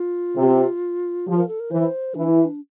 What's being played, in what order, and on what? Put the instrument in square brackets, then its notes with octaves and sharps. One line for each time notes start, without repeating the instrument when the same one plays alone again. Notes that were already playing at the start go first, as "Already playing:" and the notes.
Already playing: [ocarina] F4
[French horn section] C3
[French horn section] F3 [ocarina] G4
[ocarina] A#4
A4
A#4
[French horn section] E3 [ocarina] C5
[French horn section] E3 [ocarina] D4
[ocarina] E4
D4